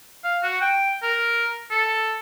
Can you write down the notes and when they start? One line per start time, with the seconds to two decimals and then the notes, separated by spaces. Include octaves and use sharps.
0.24 F5
0.43 F#4
0.61 G5
1.03 A#4
1.71 A4